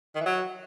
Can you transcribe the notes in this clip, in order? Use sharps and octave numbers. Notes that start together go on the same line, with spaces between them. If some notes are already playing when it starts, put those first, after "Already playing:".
D#3
E3
F#3